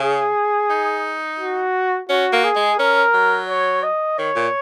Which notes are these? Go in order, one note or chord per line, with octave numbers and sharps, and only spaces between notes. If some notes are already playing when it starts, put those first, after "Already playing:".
Already playing: C#3 G#4
D#4
F#4
C#4 F#4
A#3
G#4
G#3
C#4 A#4
F#3
C#5
D#5
D#3 C#5
A#2